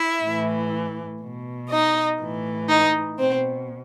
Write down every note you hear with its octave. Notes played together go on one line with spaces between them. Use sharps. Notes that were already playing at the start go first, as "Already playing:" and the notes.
Already playing: E4 E5
A2 E3
B2
D#4 D#5
A2 E3
D#4 D#5
B2 C4 C5